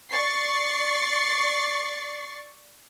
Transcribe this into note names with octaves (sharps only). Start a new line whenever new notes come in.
D5 C#6 A6 C7